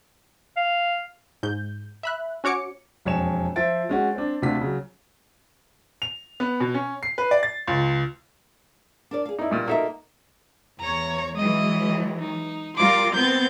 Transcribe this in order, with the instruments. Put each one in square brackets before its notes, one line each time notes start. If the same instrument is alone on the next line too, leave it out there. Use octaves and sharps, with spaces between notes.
[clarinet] F5
[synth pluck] G#2 G6
E5 B5 F#6
C#4 F#4 C#5 D6 C#7
[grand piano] E1 F2 C#5 G#5 E7
F3 C5 E5 A6 D7
G#3 C#4 F#4
C4 D4
D2 C3 D4 F4 B6
C#3 F#3
[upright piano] F7
B3
B2
C#4
C7
B4
D5
A6
C#2
[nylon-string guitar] D4 A#4 D5
G#4 F5
[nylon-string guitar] A#3 D5 [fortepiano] D#4 E4
[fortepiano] G2 A#2
[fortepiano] A#3 D#4 E5 [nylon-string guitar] F#4 A4 A#4
[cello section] E2 C#5 [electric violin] A#5
[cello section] E3 F#3 G#3 [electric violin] D#5
[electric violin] D#4
[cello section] G3 F4 A#4 [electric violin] C6 D6
[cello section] B3 C4 [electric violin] G6 A6